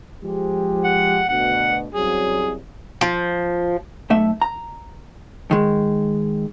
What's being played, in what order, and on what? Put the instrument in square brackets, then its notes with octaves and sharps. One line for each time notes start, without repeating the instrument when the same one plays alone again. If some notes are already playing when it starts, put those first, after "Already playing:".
[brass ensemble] F3 G#3 G4
[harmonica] F#5
[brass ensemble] D2 B2 [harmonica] F#5
[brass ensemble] C2 F#2 F#3 [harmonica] G#4
[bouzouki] F3
[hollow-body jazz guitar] B1 A3 E5
A#5
D#3 G#3